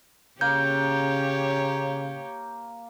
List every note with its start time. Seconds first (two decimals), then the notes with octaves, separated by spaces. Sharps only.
0.41 C#3 A#3 G4 C#5 G6